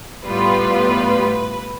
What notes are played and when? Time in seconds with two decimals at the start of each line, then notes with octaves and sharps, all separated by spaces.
0.25 A2 G3 B3 F4 B4